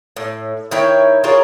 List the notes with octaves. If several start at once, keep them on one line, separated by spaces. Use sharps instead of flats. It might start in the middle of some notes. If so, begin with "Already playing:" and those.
A2
D#3 E4 C#5 G5
F4 G#4 A#4 C#5